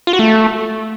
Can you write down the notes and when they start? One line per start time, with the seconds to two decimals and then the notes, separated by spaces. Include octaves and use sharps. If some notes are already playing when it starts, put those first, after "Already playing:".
0.07 F4
0.13 F#4
0.19 A3